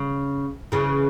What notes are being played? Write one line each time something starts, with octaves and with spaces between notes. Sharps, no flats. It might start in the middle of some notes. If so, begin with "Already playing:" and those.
Already playing: C#3
C#3 E3